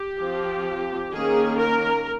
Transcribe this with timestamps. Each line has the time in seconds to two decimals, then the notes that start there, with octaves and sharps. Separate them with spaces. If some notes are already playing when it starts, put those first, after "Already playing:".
Already playing: G4
0.20 F3 C4
1.13 D#3 A#3 C#4 G#4
1.59 A#4